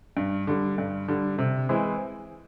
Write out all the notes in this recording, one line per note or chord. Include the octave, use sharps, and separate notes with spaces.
G2
D3 G3
G2
D3 G3
C3
E3 G#3 C4 E4